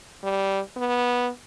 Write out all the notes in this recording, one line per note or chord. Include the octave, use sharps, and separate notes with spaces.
G3
B3